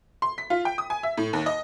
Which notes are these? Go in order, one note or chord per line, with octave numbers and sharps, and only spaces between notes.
C6
B6
F4
G5
D#6
G#5
E5
A2
D#2
D#5